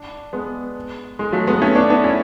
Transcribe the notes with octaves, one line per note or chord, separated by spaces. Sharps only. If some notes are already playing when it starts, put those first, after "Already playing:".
Already playing: D4
G#3 B3
G#3
F#3 A3
G#3 B3
A3 C#4
B3 D4
B3 D4
C#4 E4